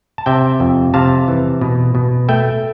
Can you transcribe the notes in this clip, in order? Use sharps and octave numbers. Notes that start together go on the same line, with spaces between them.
A5
C3 E5 G5
F2
C3 F5 A5
E3
B2
B2
A3 E5 G5